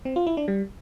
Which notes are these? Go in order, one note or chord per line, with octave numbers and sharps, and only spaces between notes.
C4
F4
E4
D4
G3